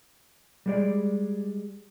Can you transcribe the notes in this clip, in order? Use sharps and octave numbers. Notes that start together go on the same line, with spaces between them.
G3 G#3 D5